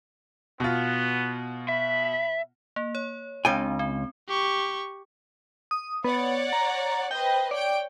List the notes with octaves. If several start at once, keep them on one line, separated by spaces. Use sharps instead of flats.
B2 B3 F4
E5 B5
A#3
C#5
C#2 G#3 C4 D4 G5 G#5
C4
G4 C#6
D#6
B3 C#5 D5 F#5
A#5
B4 C5 D#5 G5
C#5 D5 G5 D7